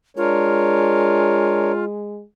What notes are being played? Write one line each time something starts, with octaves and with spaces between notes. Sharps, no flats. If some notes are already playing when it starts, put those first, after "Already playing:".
G#3 D4 F4 A#4 C#5